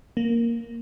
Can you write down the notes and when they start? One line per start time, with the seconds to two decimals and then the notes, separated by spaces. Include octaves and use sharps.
0.17 A#3